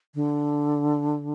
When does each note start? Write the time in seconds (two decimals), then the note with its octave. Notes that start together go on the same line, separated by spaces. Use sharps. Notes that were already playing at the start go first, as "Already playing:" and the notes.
0.15 D3